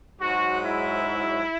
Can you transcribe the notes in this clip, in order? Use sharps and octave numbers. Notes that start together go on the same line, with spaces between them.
G#2 F#3 F#4
E4